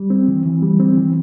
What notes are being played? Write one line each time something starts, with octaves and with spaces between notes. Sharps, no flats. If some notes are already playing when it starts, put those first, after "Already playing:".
Already playing: G3
C4
E3
E3
G3
C4
E3